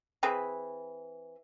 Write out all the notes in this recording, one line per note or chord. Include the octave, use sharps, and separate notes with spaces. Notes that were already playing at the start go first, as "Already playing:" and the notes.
E3 C4 G#4 B5